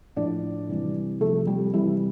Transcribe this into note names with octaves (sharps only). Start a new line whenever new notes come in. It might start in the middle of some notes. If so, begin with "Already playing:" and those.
A2 F3 D4 D5
C3 E3 G3
C3 F3 A3 A4
G3 G4
C3 E3 G3 E4